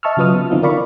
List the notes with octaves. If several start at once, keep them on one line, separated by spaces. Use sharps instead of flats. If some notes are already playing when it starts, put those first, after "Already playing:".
D#5 E5 A5 C#6 E6 F6
C#3 F#3 F4 B4 D#6 F6
B3
D3 F3 C4 D#4 F4
F4 A#4 D5 F5 B5 C#6